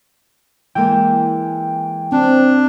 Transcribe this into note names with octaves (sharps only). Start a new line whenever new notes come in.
E3 G#3 A#3 G5
C4 D4